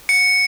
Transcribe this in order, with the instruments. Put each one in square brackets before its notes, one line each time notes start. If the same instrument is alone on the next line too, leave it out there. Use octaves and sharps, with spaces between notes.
[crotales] C#7